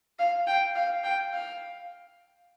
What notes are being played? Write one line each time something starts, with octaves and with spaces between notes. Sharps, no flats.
F5
G5
F5
G5
F5